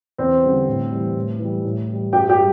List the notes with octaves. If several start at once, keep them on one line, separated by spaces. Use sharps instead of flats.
E2 C4 C5
D3 G3
A2
E3 G3
A2
E3 G3
A2
E3 G3
G2 G4 G5
G4 G5
G3